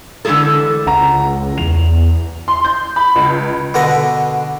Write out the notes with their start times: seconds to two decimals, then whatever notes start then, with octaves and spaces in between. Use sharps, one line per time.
0.25 D3 E3 G#3 A3 G#4 A4
0.87 C#2 F#5 A#5
1.58 E2 F7
2.48 C6
2.65 G6
2.96 B5
3.16 C#2
3.74 B2 D3 B4 D#5